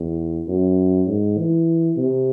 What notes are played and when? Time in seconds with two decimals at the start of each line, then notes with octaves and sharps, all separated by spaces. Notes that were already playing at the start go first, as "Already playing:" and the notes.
Already playing: E2
0.48 F#2
1.07 G#2
1.38 E3
1.97 C3